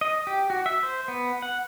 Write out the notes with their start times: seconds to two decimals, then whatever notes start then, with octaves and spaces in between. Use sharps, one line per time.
0.01 D#5
0.27 G4
0.50 F#4
0.66 E5
0.83 C5
1.08 B3
1.42 F#5